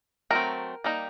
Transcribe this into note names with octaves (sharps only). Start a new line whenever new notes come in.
F#3 A3 C4 A#4
G3 A#3 D#4